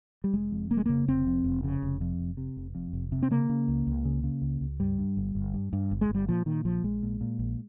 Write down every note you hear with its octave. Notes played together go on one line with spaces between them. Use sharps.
G3
F1 G#3
F2
F1 A#3
G#3
C#3 A#3
F1 C4
F2
F1
C#3
F1
F2
F1
C3
F1
F2
F1
C3
C4
C#3 A#3
C#3
C#2
C#2
C#3
C#3
C#2
C#2
G2 G3
G2
G1
G1
G2
G2
G1
G#3
G1
G3
A#2 F3
A#2 D#3
A#1 F3
A#1 G#3
A#2
A#2
A#1